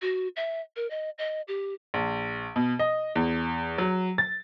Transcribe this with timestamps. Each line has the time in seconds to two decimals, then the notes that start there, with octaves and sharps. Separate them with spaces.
0.02 F#4
0.36 E5
0.76 A#4
0.90 D#5
1.18 D#5
1.48 G4
1.94 A#1
2.56 B2
2.79 D#5
3.15 E2
3.78 F#3
4.18 A6